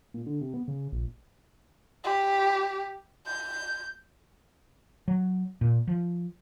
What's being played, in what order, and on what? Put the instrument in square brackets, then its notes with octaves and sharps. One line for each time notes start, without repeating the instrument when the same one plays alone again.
[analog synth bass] A#2
D3
C3
B3
C#3
A#1
[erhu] G4
G6
[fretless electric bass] F#3
A#2
F3